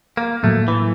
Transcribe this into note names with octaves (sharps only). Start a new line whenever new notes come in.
A#3
A2 F#3 A3 A#3
E3